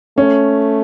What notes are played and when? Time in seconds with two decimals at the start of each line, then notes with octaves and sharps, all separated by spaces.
0.18 A3 C#4